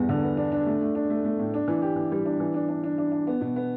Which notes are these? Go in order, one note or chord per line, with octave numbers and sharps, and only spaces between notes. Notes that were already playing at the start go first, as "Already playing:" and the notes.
Already playing: E2 G2 B3
D3
B3
D4
D4
A3
A3
D4
A3
A3
A2
D4
E3
G4
E3
G3
D4
E3
D4
D4
D4
D4
D4
B3
B2
B3